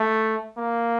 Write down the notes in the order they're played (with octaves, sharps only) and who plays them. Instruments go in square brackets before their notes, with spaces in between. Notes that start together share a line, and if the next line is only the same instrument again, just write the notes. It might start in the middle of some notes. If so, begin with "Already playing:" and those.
Already playing: [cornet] A3
A#3